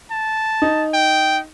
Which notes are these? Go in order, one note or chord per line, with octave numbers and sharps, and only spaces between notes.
A5
D#4
G5